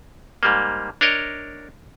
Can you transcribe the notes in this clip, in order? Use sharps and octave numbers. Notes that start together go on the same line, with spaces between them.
G#2 G3 A#3
D4 A#4 C#5 D#5